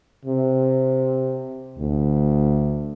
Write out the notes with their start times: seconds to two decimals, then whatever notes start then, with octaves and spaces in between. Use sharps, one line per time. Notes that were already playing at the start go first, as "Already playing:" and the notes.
0.25 C3
1.78 D2